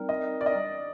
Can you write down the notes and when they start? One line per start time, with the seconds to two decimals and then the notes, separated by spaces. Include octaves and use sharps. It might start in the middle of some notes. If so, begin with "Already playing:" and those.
Already playing: G3 C4 D#4 A#4
0.09 D#5
0.41 D5
0.46 D#5